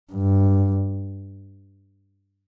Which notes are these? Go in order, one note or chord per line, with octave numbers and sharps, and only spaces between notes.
G2